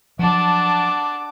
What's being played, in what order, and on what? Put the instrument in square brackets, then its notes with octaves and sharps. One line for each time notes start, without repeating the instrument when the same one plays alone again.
[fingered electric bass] F3 F#3 [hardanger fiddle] D4 A5 [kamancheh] F#5 D6